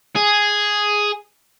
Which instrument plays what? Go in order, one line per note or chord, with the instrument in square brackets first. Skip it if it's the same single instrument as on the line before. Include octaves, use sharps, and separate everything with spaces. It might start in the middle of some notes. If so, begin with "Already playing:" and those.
[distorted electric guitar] G#4